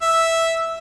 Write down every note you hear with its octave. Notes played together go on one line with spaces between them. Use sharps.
E5